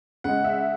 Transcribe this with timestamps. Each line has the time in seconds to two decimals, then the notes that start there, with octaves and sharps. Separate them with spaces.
0.24 C#3 G#3 F#5
0.44 E5